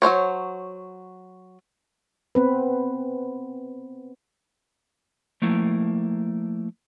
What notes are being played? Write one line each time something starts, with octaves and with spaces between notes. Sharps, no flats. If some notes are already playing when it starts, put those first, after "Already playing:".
F#3 C#4 C5 C#5
B3 C4 B4
F3 A3 A#3 E4